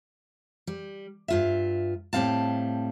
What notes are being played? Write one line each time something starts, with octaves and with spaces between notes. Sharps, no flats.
G3
G2 F4 E5
A2 G3 C4 F5 A5